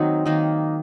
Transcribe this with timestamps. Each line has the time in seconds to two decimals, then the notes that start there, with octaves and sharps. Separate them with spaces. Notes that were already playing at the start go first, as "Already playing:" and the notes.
Already playing: D#3 F#3 A#3 C4 D#4
0.25 D#3 A#3 D#4